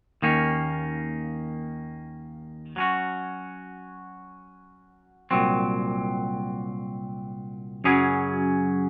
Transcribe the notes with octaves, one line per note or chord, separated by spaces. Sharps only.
D#2 D#3 A#3 C#4
F#3 C#4 F#4
C2 A#2 F#3 C4
F#2 C#3 F#3 C#4 G#4